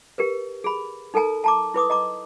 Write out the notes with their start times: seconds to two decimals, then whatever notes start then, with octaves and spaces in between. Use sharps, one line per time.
0.18 G4 A#4 B4
0.64 G#4 B5
1.14 D#4 A4 A#4 G#5 A#5
1.44 A5 A#5 D6
1.74 E4 B4 D6 D#6
1.90 D#5 A#5 D6